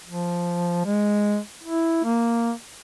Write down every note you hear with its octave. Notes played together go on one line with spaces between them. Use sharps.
F3
G#3
E4
A#3